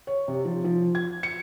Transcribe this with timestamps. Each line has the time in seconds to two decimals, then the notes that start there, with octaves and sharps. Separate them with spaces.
0.07 C#5
0.28 C3
0.45 F3
0.64 F3
0.95 G#6
1.23 C#7